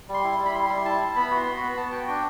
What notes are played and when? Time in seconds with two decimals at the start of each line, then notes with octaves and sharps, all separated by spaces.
0.09 G3
0.14 C6
0.24 E4
0.39 G3
0.46 B5
0.55 E4 C6
0.70 G3
0.85 E4 A5
1.00 E4
1.16 B3 B5
1.31 F#4
1.37 C6
1.46 F#4
1.57 B5
1.62 B3
1.77 B3 A5
1.92 F#4 G5
2.07 D4 G5